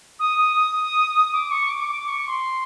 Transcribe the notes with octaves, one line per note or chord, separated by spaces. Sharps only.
D#6
D#6
D#6
D6
C#6
D6
D6
C#6
C6